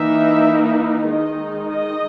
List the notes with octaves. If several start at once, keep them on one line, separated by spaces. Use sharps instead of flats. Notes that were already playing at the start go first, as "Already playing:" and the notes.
Already playing: E3 A#3 D#4 E5
D#3 G#3 D#4 D#5
D#5